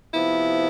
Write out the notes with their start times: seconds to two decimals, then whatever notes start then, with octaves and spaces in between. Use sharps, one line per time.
0.13 C3 F3 B3 E4